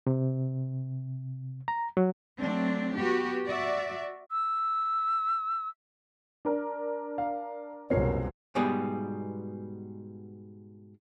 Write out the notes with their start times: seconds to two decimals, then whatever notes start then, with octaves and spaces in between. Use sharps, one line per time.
0.07 C3
1.68 A#5
1.97 F#3
2.40 F#3 A3 C4 D4
2.98 B3 F#4 G4
3.46 F#4 D5 E5
4.31 E6
6.45 D4 A#4
7.18 F5
7.90 F#1 C2 F2 B2 A#4 C#5 C7
8.55 G#2 B2 G3 B3 G#4